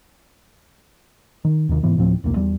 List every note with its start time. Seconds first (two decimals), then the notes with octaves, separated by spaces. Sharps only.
1.45 D#3
1.69 D#2 C3 D#3
1.83 G#2 C#3 E3 B3
1.97 D2 A2 F3 C4
2.24 E1 C2 C3 A#3
2.36 E2 G3